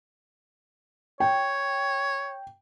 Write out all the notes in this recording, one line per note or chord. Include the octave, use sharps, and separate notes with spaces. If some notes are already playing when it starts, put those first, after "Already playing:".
C#5 G5